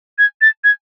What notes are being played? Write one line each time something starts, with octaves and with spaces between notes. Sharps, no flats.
G#6
A6
G#6